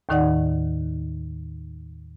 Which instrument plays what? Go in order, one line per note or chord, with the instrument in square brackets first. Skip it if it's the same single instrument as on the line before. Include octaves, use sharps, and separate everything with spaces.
[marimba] D#2 A2 D#3 D#4 D5 F#5